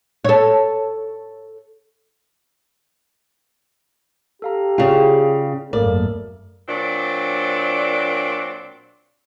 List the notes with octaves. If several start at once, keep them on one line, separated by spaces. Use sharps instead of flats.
A4 C#5
G4 A4 F5 A#5
C#3 F4 G#4 D5 G5
G#1 F#2 A3 A#3 A4 A#4 D5
A#2 F#3 C4 D4 D5